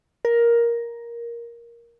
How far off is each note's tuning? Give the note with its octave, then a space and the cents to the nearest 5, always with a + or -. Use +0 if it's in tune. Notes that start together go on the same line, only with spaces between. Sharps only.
A#4 +10